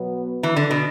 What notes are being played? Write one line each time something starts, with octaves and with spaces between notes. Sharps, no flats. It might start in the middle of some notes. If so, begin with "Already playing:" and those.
Already playing: B2 F#3 B3
E3
D3
B2